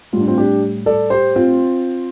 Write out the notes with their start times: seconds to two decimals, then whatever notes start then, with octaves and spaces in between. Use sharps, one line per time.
0.13 A2 G3 F4
0.21 D4
0.28 C4 F4
0.38 D4 G4
0.86 A4 D5
1.10 G4 C5
1.36 C4 F4